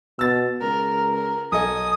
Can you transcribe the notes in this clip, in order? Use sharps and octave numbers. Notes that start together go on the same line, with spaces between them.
B2 E6 A6
C#2 A#4
A#4
B1 A4 D#5 G#5 D#6